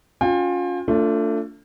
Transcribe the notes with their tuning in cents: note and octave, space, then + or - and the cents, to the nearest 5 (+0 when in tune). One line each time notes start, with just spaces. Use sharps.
C#4 +25 F4 +30 G5 +40
A3 +25 D4 -25 F4 +0